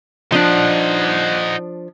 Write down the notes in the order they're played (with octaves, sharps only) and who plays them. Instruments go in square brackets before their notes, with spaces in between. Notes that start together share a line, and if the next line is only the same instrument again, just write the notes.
[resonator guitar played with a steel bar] F3 D4 [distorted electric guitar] D#4 F#5